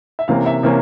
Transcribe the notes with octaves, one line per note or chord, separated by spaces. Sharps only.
E5
C3 E3 A#3 C#4 F5
E5
C3 E3 A#3 C#4